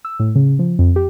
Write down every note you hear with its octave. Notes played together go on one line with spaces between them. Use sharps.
E6
A2
C#3
F3
F2
G4